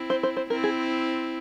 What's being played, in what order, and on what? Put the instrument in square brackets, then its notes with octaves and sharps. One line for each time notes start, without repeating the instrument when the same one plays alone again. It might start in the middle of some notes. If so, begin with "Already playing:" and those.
Already playing: [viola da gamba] C4 E4
[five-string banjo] C5
C5
C5
[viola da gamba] C4 E4 [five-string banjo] A#4
[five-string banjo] G#4